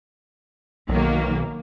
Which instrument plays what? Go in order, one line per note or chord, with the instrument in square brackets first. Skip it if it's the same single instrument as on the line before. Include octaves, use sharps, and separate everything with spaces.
[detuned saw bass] B1 [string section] D#3 F#3 A#3